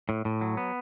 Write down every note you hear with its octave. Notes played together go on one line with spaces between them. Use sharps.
A2
A2
F#3
B3